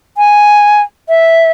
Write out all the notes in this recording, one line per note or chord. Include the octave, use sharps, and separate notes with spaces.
G#5
E5